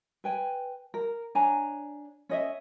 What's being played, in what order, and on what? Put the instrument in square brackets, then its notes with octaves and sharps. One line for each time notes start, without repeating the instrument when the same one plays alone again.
[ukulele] B4 G5 G#5
A#4
D4 C#5 G#5 A#5
C#4 D#5 E5